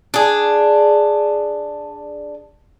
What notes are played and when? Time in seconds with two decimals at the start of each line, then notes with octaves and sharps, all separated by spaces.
0.14 D4 G#4